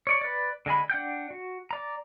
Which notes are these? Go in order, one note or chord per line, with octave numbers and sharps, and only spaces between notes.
C#5 D5 C#6
B4 D5
D3 G#3 G#5 B5
D4 F#5 G5 G6
F#4
D5 A#5